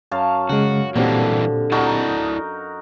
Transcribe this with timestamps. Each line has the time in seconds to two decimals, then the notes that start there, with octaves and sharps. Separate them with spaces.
0.11 F#2 F5 A5
0.49 C#3 G#3 F#4
0.96 A#2 D3 E3 G3 A#3 C4 G4
1.72 D#4 E4 F#4 A#4 D5 A5